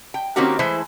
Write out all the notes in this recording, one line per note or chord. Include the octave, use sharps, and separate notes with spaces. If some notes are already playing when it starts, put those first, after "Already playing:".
G5
D#3 A#3 C4 C#4 F#4 G4
E3 G#3 A3 E4 C5